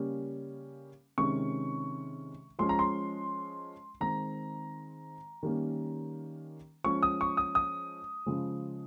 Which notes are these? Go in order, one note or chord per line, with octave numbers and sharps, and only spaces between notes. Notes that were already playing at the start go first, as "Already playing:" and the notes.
Already playing: C#3 G3 A#3 C#4
C3 D#3 G#3 C#4 C#6
F3 G#3 C#4 C6
A#5
C6
D#3 G#3 C4 A#5
D#3 G3 A#3 C#4
F3 G#3 C#4 C#6
D#6
C#6
D#6
D#6
C#3 F3 G#3